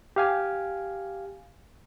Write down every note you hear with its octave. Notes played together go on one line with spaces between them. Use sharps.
G4 F5 G#5